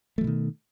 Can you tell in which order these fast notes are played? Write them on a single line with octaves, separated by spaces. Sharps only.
A3 F3 B2 D#3